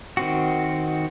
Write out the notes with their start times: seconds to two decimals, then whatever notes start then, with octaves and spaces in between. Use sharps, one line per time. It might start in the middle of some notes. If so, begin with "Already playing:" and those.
0.17 D#3 C4 F#4